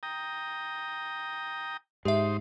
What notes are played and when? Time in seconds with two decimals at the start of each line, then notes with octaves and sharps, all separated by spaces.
0.03 G5 A#5 D#6
2.05 G#2 D#4 G4 C5 E5